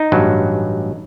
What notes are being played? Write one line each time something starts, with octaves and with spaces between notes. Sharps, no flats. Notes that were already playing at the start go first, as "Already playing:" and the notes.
Already playing: D#4
A1 G2 F#3